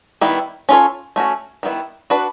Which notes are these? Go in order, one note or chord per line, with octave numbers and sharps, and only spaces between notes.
D#3 G3 B3 E4
C#4 F4 A4 C#5
A3 C#4 F#4
D#3 G3 B3 E4
D4 F#4 B4 D5